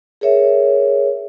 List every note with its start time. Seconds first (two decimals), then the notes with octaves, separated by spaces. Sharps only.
0.21 G#4 A#4 C#5 E5